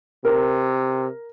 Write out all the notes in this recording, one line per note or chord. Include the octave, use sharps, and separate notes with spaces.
C3 A#4